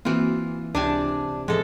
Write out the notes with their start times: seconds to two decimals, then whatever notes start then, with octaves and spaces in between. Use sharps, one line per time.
0.05 E3 A#3 C4 F4 F#4
0.75 C#2 C3 D4 G#5 A5
1.48 E2 A2 F3 G#3 A4